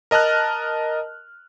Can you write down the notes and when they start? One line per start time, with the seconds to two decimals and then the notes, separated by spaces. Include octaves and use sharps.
0.11 A#4 D#5 A5 F6 F#6